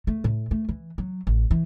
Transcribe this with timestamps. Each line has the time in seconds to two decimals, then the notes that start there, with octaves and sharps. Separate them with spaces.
0.07 A3
0.24 A2
0.51 A3
0.69 E3
0.98 F#3
1.27 A1
1.51 E3